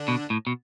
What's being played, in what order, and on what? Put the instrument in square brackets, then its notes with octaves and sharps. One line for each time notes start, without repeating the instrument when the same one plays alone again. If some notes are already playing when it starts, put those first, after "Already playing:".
Already playing: [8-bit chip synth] D3 D4
[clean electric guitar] B2
A2
B2